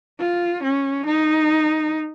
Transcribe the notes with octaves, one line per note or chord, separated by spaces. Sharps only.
F4
C#4
D#4